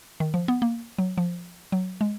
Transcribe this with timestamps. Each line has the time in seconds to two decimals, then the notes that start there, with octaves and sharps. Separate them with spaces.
0.20 D#3
0.34 F3
0.48 B3
0.62 A#3
0.99 F#3
1.18 F3
1.72 F#3
2.01 G#3